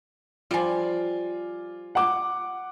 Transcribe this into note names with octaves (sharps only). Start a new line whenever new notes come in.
F3 G3 F4 D5 G#5
F#5 D6